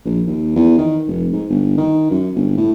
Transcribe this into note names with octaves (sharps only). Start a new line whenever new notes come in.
A#1
D#2
E2
D#3
F1
G#2
G1
D#3
F#2
G1
A2